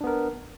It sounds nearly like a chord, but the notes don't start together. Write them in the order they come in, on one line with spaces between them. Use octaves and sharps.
D4 B3 A#4